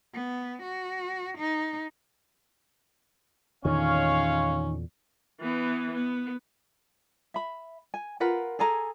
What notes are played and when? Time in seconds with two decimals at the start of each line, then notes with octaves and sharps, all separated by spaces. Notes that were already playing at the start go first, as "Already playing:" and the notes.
0.14 B3
0.63 F#4
1.38 D#4
3.65 E2 A#2 D3 D#3 G#3 C#4 C#5 F5
5.41 E3 B3
5.94 B3
7.34 E5 B5
7.94 G#5
8.20 F4 A#4 B4 F#5
8.59 G#4 A4 G#5 A#5